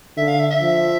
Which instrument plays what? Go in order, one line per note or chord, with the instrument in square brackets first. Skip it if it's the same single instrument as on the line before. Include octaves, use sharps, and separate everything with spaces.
[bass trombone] D3 [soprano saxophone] E5
[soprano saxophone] F5
E5
E5
[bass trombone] F3